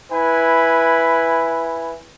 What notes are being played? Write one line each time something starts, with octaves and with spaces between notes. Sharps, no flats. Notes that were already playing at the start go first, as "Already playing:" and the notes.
E4 B4 G#5